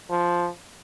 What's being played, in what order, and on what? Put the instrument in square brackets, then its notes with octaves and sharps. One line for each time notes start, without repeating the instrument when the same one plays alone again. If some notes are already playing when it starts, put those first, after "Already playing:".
[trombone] F3